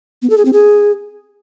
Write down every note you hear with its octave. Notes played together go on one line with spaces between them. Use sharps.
B3
A4
G#4
C4
G#4